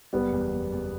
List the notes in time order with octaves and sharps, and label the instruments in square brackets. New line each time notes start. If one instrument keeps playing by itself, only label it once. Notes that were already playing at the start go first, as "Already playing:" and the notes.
[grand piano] F#1 [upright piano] G3 B3
[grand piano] E2
E2
E2